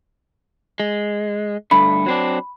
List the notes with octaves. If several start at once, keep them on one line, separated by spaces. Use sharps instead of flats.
G#3
G2 D3 A3 B5
F#3 C4 D4